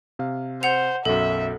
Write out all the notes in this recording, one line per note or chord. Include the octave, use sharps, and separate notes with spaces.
C3 F5
C5 F#5 F7
B1 F#2 A4 E5